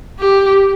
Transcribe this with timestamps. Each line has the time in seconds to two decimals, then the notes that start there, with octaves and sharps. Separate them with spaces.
0.19 G4